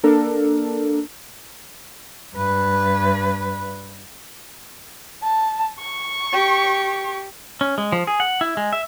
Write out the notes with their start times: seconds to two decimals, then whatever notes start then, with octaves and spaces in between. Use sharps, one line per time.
0.04 A#3 D4 A4 A#4
2.35 G2 B4
5.23 A5
5.79 C#6
6.31 G4
7.61 C#4
7.78 G#3
7.92 F3
8.07 G#4
8.20 F#5
8.41 E4
8.57 G#3
8.73 E5